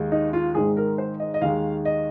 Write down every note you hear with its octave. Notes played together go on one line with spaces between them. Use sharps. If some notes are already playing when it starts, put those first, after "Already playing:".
Already playing: D#2 D#3 G#3
D#4
F4
G#1 G#2 D#3 G#3 G#4
A#4
C5
D#5
D#5
D#2 D#3 G#3 F5
D#5